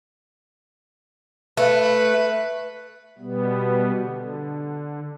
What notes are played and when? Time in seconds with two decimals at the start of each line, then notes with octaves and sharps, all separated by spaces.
1.57 A3 B4
3.18 B2 G3 B3
4.01 D3